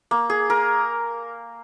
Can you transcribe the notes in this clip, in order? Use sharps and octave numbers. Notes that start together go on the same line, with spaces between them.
A#3
G#4
A#4